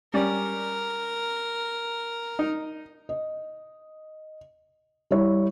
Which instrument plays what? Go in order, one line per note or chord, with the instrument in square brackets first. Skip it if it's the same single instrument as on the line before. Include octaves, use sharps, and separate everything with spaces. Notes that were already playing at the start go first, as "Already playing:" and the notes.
[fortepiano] G3 C#4 D5 [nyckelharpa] A#4
[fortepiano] D#4
[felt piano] D#5
G3 E4 C#5